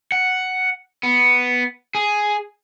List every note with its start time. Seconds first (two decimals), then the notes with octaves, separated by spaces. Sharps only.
0.12 F#5
1.03 B3
1.95 G#4